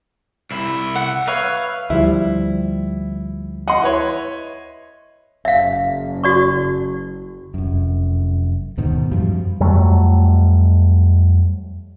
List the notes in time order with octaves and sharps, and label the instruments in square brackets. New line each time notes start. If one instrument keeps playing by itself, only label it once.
[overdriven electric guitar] C2 E4
[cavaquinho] F#5
[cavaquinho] B4 C#5 E5 [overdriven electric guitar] F5
[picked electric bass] D2 F3 G3 [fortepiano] E4
[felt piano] D#5 C6 [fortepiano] F#5
[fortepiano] E4 B4 C#5
[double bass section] F#1 [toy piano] E5 F5
[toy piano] F#4 D5 C#6
[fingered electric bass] F1 F#2
D2 G#2 B2 D#3
F#2 F3 G3
[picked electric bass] F2 F#3 G3 A3